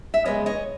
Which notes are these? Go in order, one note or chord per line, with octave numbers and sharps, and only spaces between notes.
E5
C#3 F3 G#3 B3 C#5 D#5
C#5 D#5